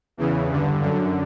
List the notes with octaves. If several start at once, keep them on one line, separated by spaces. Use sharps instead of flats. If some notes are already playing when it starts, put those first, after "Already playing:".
E2 C#3 E3
G2 D3
F#2 D3